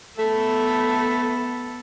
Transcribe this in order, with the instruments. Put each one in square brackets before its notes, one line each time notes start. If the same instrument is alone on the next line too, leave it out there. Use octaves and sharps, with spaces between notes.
[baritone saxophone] A3 [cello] B3 A4